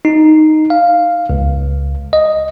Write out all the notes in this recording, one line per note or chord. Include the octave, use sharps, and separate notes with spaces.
D#4
F5
C#2
D#5